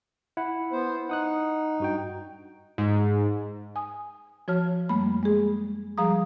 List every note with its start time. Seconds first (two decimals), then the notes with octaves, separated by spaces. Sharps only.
0.37 E4 F#5
0.72 B3 C5
1.09 D#4 F#5 D#6 F#6
1.80 G2 F#4 G5
2.78 G#2
3.76 G#5 D#6
4.48 F3 F#4 C#5 A5 F6
4.89 F#2 G3 A3 A#3 B5
5.23 G#3 G#4
5.98 F3 G3 G#4 F5 A#5 D#6